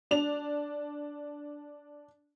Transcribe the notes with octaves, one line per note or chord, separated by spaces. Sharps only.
D4 F7